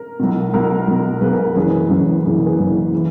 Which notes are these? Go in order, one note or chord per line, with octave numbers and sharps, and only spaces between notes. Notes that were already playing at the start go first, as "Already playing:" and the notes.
Already playing: A#4
B1 B2
B1 B2 A#4
B1 B2
B1 B2 G#4 B4
A#4
A#4
F#1 F#2 E3 G#4 B4
F#1 F#2 E3
F#1 F#2 E3 G#4
A#4
G#4 B4
F#1 F#2 E3
E3